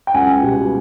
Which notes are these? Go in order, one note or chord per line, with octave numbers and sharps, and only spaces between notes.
G5
C#2 F#5 G#5
B2 G3